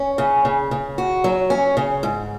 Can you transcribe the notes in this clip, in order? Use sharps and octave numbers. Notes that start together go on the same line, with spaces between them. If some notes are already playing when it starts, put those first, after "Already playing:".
Already playing: C#4
C#3
C#3
C#3
F#4
F#3
C#4
C#3
G#2